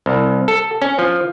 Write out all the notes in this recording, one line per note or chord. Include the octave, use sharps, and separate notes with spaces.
C2
A4
C#4
F3